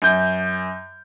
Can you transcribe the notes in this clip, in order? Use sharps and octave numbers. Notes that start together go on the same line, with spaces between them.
F#2 G6